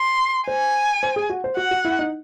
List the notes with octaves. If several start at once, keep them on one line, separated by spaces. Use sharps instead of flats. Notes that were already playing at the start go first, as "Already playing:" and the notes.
Already playing: C6
C5 G#5
C5
G#4
F#4
C5
F#4 F#5
F#4
E4
D#4